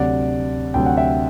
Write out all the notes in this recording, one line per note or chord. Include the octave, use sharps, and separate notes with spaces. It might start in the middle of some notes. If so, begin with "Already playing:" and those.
Already playing: D2 C3 F#3 D5 F#5
D2 C3 F#3 G5
F#5
E5 G5